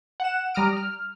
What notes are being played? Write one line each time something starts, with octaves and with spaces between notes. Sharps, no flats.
F#5 E7
G3 A#5 D#6 F6 D7
F6